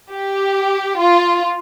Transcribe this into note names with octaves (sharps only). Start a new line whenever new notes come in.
G4
F4